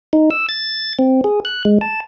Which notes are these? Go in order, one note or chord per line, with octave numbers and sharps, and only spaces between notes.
D#4
E6
A6
C4
G#4
F#6
G#3
A5